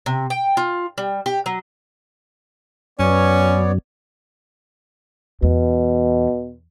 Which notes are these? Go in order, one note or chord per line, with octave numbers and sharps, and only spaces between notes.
C3
G5
F4
G3
G4
F#3
F#2 B3 C#4 C#5 D5
E2 B2